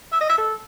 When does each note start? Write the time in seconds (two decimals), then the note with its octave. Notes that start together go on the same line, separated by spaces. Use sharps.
0.12 E5
0.21 D#5
0.29 E5
0.38 A4